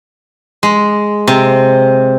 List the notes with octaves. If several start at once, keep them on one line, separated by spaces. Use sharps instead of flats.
G#3
C3